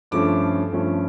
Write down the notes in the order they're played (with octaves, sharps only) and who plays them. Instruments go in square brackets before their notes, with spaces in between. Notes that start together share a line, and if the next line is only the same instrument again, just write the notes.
[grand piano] G2 F3 A3 C#4 D6
G2 F3 A3 C#4